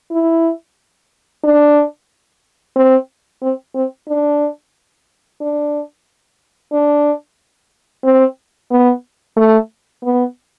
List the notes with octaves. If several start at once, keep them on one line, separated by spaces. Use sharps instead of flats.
E4
D4
C4
C4
C4
D4
D4
D4
C4
B3
A3
B3